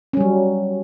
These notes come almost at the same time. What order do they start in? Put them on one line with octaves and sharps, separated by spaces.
C#4 G3 F#3